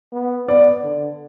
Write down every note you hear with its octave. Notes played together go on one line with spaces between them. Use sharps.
B3
B3 D5
D3